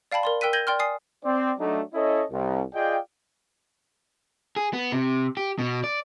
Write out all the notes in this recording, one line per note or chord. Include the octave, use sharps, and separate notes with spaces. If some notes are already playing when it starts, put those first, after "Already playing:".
D5 F5 G5 A5 B5
A#4 D5 C6
A#4 G5 E6 F#6 B6 D#7
G6 G#6 A#6 D#7 F#7 G7
D5 G5 C6 F6
D5 G#5 D#6 C7
C4 D5
F#3 A3 D4 D#4
C#4 E4 A4 C#5 D#5
C2
F4 G#4 D5 D#5 F5 G5
G#4
B3
C3
G4
B2
D5